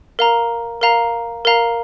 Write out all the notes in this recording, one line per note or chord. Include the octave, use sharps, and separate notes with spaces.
A#4 F5 A#5
A#4 F5 A#5
A#4 F5 A#5